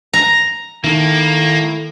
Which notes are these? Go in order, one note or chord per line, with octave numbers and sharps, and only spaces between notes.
A#5
D#3 A#3 E4 A4